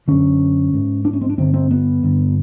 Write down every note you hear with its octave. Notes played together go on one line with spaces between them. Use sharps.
F#2 D3 C#4
G#2
D4
C#4
C4
D4
G2 D3 C4
C4
B3
G2 D3